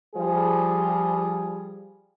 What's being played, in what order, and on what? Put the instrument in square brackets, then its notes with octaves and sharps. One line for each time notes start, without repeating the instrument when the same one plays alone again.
[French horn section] F3 G3 G#4